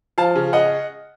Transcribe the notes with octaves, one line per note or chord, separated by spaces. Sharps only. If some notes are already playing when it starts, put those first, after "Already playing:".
F3 F5 A5
C#3
D#5 F#5